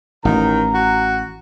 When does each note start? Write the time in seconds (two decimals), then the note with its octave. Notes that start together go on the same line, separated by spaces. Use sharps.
0.25 A1 D#3 A#5
0.74 F#4